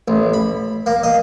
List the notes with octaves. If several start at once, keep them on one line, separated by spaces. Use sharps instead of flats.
A1
B5
A#3
D#5